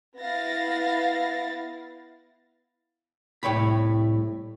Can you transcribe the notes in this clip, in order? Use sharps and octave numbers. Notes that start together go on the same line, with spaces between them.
B3 E4 F5 A6 A#6
C2 A2 C#5 G5 B5